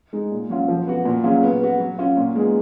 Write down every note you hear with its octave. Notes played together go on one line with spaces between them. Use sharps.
G#3 D#4
A#2
F#3 C#4 F4
F3
B3 F#4
A#2
F#3 C#4 F4 G#4
B3
F#4 B4
F#3
C#4 F4
A#2
G#3 B3 D#4 G#4